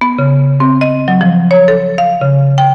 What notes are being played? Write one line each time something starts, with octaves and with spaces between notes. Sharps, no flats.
B3
C#3
C4
D#5
F#3
F3
C#5
A4
F5
C#3
G5